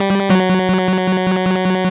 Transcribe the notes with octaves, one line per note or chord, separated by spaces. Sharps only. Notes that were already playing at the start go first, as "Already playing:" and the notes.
Already playing: G3
F#3